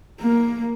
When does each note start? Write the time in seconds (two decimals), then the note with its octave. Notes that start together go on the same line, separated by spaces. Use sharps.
0.21 A#3